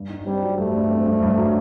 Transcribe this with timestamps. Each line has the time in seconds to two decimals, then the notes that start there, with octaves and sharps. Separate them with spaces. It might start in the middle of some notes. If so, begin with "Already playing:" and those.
Already playing: G2
0.09 D#4
0.26 G3 C4
0.43 F#3
0.58 G2 A3
0.75 G2
0.91 C4
1.06 G2
1.22 G2
1.38 F#3